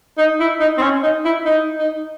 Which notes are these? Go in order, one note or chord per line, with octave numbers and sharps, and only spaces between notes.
D#4
E4
D#4
C4
C#4
D#4
E4
D#4
D#4